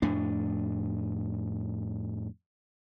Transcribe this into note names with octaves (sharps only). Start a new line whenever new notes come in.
F2 A2 D4